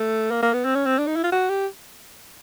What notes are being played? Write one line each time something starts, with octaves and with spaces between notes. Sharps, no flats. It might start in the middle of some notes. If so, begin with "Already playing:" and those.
Already playing: A3
A#3
A#3
B3
C4
C#4
C4
D4
D#4
E4
F4
F#4
G4